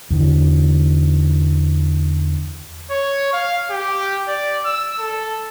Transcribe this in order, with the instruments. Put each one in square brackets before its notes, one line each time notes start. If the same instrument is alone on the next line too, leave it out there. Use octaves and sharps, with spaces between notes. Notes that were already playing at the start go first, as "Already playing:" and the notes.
[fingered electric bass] E2 D3 E3
[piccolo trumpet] C#5
F5
G4
D5
E6
A4